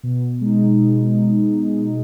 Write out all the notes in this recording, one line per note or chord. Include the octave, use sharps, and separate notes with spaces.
B2
G#3 D#4
B2